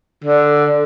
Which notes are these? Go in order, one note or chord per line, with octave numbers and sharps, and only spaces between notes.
D3